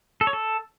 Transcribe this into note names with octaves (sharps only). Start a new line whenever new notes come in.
A4
C#5
A4